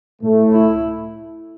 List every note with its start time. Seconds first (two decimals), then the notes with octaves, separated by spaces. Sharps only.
0.22 A2 A3
0.52 E4